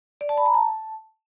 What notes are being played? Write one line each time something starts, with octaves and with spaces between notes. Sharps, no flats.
D5
A5
B5
A#5
A5